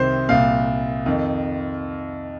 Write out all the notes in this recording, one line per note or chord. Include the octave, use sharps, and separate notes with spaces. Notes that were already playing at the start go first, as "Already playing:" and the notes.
Already playing: C2 C3 D#3 C5
C2 A#2 F5
F2 D#3